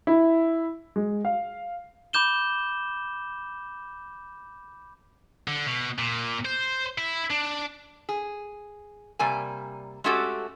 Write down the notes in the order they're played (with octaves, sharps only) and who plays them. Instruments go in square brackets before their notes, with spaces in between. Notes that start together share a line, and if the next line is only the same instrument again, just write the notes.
[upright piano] E4
G#3
F5
[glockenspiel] B5 D6 G6 E7 G7
[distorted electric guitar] D3
B2
A#2
C5
E4
D4
[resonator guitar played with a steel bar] G#4
C3 G3 A#3 D5 G#5
G#3 A3 C#4 F#4 G4 A4